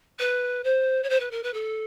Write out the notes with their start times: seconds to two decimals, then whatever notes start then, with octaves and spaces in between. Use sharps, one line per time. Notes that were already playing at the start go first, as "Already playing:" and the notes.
0.19 B4
0.64 C5
1.03 C#5
1.09 C5
1.19 B4
1.31 A#4
1.43 B4
1.53 A4